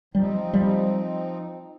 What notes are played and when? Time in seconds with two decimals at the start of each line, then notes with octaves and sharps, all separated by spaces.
0.14 F3 G3 C4 D#4
0.54 G3